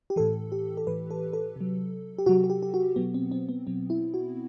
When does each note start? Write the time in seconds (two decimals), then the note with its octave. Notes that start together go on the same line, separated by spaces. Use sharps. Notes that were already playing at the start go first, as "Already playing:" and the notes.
0.10 G4
0.16 A2 E3 A4
0.52 G4
0.77 A4
0.87 A2 E3 B4
1.10 A4
1.33 A4
1.56 C3 F#3
2.18 G4
2.26 C3 F#3 F#4
2.44 F#4
2.50 G4
2.62 G4
2.74 F#4
2.96 B2 F#3 B3
3.14 C4
3.31 C4
3.49 B3
3.67 B2 F#3 C4
3.90 E4
4.14 F#4